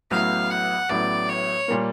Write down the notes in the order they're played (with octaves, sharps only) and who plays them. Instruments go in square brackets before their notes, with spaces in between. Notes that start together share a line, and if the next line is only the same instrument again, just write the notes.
[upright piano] A1 A2 F#3 B3 [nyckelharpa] F5
[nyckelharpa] F#5
[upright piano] A1 A2 F#3 B3 [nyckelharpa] D5
[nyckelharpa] C#5
[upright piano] A#2 G3 A#3